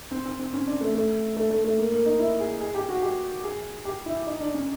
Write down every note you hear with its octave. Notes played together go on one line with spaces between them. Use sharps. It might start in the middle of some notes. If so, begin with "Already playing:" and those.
C4
C4
C4
C#4
D4
A3
A3
A3
A3
A3
A#3
A#3
D#4
E4
G#4
G#4
G4
F#4
G4
G#4
G4
E4
D#4
D4
C#4